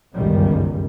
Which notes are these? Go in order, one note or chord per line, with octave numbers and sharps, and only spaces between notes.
G1 C#2 F#2 D#3 G3